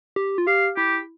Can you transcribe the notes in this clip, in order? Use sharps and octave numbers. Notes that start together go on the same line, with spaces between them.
G4
F4
G4 F5
E4 G4